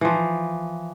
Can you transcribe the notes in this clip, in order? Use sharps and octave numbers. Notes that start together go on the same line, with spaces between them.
E3 F3